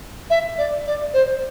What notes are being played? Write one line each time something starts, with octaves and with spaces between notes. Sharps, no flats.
E5
D5
D5
C5